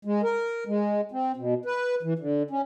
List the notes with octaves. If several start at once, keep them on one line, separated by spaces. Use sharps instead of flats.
G#3
A#4
G#3
C4
B2
B4
E3
D3
C#4